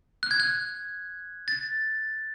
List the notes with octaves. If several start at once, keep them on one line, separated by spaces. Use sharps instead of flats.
F#6
G#6
F#6
A6